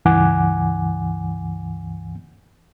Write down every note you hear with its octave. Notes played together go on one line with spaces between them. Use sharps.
C#2 G2 E3 F#5 G#5 D6